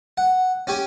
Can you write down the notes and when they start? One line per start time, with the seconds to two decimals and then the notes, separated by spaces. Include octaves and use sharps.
0.17 F#5
0.67 C#4 G4 C#5 G#5